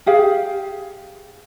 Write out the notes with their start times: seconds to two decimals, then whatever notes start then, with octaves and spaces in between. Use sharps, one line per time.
0.06 G4 G#4 F5